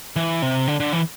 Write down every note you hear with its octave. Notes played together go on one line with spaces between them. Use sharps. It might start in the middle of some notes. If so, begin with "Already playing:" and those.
E3
C3
D3
D3
E3